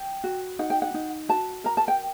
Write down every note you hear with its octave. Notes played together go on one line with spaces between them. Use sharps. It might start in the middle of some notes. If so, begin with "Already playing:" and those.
Already playing: G5
F#4
D#4 F#5
G5
F#5
D#4
F#4 A5
A#4 A#5
A5
G5